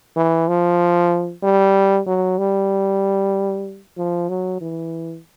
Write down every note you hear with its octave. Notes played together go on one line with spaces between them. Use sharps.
E3
F3
G3
F#3
G3
F3
F#3
E3